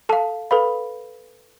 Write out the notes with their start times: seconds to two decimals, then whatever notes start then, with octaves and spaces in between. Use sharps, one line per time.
0.09 A4 F5 A5
0.51 A4 B4 F5 B5